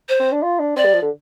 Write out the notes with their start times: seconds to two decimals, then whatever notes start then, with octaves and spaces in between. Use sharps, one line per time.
0.09 C5
0.20 C4
0.32 D4
0.42 F4
0.59 D4
0.76 C4 D5
0.85 G3
0.93 F3
1.02 D3